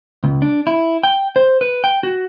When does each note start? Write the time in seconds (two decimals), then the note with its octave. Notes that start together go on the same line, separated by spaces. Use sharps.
0.24 C#2
0.42 D4
0.67 E4
1.03 G5
1.36 C5
1.61 B4
1.84 G5
2.03 F#4